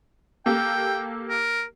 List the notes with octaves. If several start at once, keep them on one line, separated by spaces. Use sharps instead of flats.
A#3 G4 A4 G5
A#4